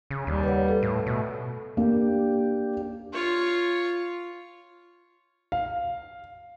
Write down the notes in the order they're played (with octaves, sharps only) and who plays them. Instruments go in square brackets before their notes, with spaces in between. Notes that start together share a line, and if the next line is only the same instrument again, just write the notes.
[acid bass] C#3
[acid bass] D#2 [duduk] G3
[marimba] B4 C#5 F#5
A4
[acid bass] A2
[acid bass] B2 [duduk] A3
[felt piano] A#3 [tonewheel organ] D4 G4
[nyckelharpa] F4 C#5
[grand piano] F5